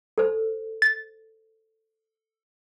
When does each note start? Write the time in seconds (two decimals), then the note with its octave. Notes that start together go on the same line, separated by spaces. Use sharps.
0.18 A4 C5
0.82 A6